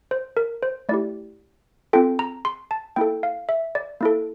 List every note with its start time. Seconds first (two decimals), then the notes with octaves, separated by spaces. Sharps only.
0.11 C5
0.37 A#4
0.63 C5
0.89 A3 E4 G4 D5
1.93 C4 F4 A4 G5
2.19 A#5
2.45 C6
2.71 A5
2.96 A#3 E4 A4 G5
3.23 F5
3.49 E5
3.75 D5
4.01 A#3 E4 A4